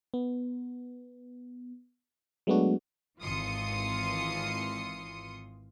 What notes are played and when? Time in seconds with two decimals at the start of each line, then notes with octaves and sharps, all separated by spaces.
0.14 B3
2.47 F#3 G#3 A3 B3 D4 F#4
3.22 G#1 E3 F4 C6 D#6 C#7